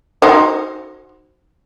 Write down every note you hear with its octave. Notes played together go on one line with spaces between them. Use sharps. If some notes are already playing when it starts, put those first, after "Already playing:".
D#4 F#4 C5